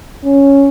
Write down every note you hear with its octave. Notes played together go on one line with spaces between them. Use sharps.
C#4